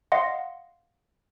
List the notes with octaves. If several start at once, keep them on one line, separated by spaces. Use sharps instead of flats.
D#5 F5 F#5 C6